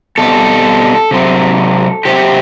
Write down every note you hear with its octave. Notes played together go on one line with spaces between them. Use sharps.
B2 G3 C4 A4
C3 F#3 C4
C3 F#3 C4 G4